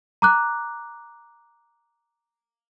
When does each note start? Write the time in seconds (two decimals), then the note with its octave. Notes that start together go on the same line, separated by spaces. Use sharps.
0.22 A#5 D6 F#6